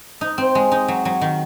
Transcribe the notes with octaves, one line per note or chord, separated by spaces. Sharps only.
D#4
C4
G#3
D#4
F#3
F#3
D#3